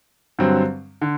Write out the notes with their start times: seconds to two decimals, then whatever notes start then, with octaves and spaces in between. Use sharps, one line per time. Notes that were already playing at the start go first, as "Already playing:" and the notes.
0.39 G2 D3 F#3 C4
1.02 D3